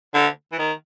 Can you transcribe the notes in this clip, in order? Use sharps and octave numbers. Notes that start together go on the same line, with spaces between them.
D3
E3
D#3